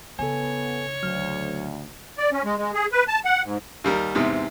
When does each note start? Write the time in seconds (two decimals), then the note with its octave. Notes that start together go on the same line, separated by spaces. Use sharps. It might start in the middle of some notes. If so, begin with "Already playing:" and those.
0.19 C#3 B3 A4 C#5 G#5
1.03 D2 F#3 F6
2.18 D5
2.32 C#4
2.44 G#3
2.57 G#3
2.74 G#4
2.92 B4
3.08 A5
3.25 F#5
3.44 G#2
3.84 D#2 G3 A#4
4.15 E2 G#2 C3